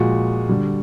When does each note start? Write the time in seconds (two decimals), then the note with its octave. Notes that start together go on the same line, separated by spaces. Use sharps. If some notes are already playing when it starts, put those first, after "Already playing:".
Already playing: A#2 F3 G#3 F#4
0.49 D3 G3